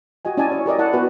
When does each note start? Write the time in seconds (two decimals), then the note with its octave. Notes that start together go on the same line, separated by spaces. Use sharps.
0.25 F#4 G4 D#5 G#5
0.37 C#4 E4 D5 D#5 G#5 A5
0.52 C#5
0.66 G4 A#4 D5 D#5
0.79 E4 F#5 A5
0.93 B3 F#4 B4 E5 A5